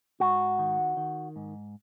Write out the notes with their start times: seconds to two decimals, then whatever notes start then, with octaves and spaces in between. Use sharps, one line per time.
0.20 G#2 F#4
0.59 D#3
0.97 D#3
1.36 G#2